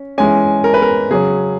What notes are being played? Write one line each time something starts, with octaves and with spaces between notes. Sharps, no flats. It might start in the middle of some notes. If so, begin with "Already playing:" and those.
Already playing: C#4
E3 G#3 C#4 G#5
A#4
B4
A#4
C#3 F#3 C#4 G#4